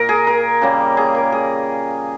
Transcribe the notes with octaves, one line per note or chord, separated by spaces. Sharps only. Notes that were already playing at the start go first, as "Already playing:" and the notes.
Already playing: A#2 A#4
G#4
A#4
C#3 G3 A#3
G#4
A#4
G#4